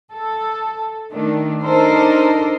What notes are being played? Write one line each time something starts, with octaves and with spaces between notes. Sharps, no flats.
A4
D#3 A3 D4
D4 D#4 A4 A#4 C5